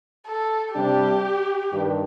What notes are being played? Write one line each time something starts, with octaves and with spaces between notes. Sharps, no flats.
A4
C3 G3 D4 G4
G2 D#3 G3 D4